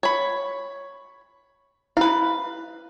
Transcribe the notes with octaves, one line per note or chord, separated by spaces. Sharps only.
C#5 B5
E4 B4 F5